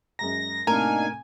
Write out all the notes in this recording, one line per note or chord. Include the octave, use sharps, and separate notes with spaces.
F#2 G#3 A#5 A#6
A2 C3 A#3 D4 D#4 A#4 G#5